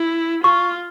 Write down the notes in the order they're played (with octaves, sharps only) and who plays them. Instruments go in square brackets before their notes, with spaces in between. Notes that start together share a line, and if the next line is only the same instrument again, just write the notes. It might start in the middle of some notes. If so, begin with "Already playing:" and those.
Already playing: [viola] E4
[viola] F4 [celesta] C#6